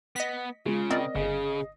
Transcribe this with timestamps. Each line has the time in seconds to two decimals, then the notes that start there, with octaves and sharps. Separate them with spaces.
0.16 B3 D#5 B6
0.66 C#3 G#3 F4
0.90 C4 A#4 D5 D#5
1.15 G1 C#3 G#4